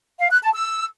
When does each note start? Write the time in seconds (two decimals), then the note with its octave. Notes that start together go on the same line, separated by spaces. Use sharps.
0.20 F5
0.31 F#6
0.43 A5
0.54 E6